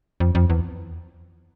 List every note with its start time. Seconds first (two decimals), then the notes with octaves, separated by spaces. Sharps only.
0.20 F2
0.35 F2
0.50 E2